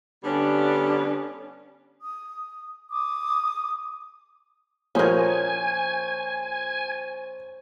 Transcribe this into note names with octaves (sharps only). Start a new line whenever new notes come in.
D3 G3 B3 C#4 D4
D#6
D6 D#6
A#1 F3 C#4 A#4 C5 C#5 G#5 D#6